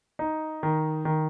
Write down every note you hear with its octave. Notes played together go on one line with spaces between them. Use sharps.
D#4
D#3
D#3